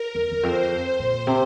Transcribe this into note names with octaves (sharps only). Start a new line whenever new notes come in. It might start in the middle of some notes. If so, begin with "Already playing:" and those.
Already playing: A#4
E2
E2
F2 C5
A#2
C3